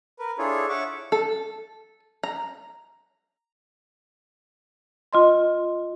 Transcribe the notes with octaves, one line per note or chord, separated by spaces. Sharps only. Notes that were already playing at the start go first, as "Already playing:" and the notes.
A#4 B4
D4 E4 F4 G#4 A4 C#5
C#5 E5 F#5 C#6 D6
A4
A#5
F4 D#5 C6